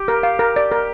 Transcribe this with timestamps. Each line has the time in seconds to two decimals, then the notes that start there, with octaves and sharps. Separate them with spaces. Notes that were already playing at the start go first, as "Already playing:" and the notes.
Already playing: G4
0.08 A#4
0.23 F5
0.39 A#4
0.56 D5
0.71 A#4